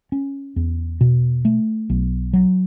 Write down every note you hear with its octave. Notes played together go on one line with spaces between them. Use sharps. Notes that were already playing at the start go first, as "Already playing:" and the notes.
C#4
E2
B2
A3
B1
F#3